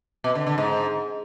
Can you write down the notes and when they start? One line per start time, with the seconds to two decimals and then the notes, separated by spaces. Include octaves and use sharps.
0.24 B2
0.35 D3
0.47 D3
0.58 G#2